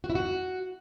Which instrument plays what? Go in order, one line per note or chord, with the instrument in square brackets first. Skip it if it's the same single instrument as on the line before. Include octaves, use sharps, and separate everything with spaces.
[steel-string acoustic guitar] F#4
E4
F#4